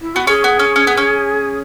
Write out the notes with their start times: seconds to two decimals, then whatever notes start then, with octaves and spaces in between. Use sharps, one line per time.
0.01 E4
0.15 B3 F#4
0.27 C#4 G#4
0.44 B3
0.59 C#4
0.76 C#4
0.87 B3
0.97 C#4